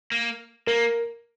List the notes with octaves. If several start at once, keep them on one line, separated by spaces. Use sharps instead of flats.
A#3
A#3 A#4